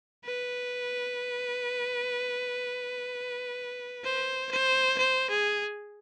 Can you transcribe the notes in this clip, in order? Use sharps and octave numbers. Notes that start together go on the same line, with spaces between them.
B4
C5
C5
C5
G#4